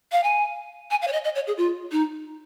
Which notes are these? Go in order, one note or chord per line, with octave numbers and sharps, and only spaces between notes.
F5
G#5
G#5
F5
C#5
D#5
D#5
C#5
G#4
F4
D#4